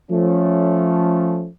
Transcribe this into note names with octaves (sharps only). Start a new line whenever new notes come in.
F3 A3 C#4